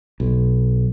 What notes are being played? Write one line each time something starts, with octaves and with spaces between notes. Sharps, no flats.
B1